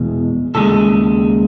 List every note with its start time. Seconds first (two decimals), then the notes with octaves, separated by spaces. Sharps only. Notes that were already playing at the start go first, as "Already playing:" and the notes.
Already playing: E2 B2 G#3
0.55 D#2 C#3 G#3 A4